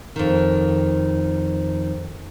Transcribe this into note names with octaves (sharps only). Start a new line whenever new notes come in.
F2 D#3